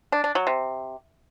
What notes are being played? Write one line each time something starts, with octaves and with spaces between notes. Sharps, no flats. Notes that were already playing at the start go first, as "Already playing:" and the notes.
D4
D4
F#3
C3